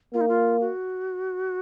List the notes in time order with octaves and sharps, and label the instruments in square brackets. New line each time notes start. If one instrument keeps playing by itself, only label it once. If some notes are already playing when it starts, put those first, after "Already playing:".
[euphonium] A#3 [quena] F4
[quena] D#4
F4
F#4